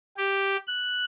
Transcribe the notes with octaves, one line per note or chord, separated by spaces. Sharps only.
G4
F#6